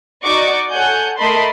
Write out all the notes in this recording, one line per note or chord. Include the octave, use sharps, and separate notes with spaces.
D#4 F#4 D5 D#5 C#6 D6
A4 C#5 F#5 G#5 G6
A3 A#4 D#5 A5 B5 C6